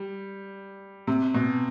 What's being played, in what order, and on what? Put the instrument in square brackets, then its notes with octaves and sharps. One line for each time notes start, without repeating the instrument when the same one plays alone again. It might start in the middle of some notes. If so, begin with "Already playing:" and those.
Already playing: [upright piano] G3
C3
B2